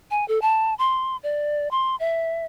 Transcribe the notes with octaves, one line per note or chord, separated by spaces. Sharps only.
G#5
A4
A5
C6
D5
C6
E5